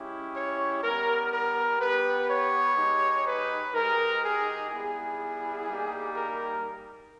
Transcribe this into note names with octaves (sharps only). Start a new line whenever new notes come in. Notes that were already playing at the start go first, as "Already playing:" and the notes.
Already playing: G#3 C#4 E4 G4
C#5
G3 B3 G4 A#4
A#4
B3 G4 B4
C#5
G#3 D#4 G4
B4
G#3 D#4 G4 A#4
G#4
G3 B3 E4 G#4
G3 A#3 D#4 G4
A#4